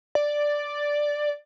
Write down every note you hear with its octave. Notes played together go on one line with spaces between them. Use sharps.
D5